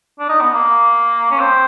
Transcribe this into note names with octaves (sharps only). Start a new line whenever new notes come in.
D4
D#4
B3
A#3
C#4
C4